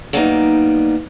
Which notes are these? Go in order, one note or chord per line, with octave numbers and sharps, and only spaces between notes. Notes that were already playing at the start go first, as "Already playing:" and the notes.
F#3 G3 A#3 B3 D4 D#4